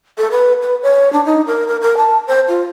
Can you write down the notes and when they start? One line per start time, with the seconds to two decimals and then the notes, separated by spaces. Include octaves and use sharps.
0.18 A4
0.31 B4
0.62 B4
0.83 C#5
1.13 D4
1.25 D#4
1.47 A#4
1.68 A#4
1.82 A#4
1.97 A5
2.27 C5
2.48 F4